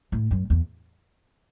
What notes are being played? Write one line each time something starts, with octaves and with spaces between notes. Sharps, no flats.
A2
F#2
E2